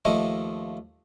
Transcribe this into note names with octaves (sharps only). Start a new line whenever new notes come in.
D#2 F3 A3 D#5